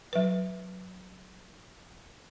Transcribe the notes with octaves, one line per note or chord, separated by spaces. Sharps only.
F#3 B4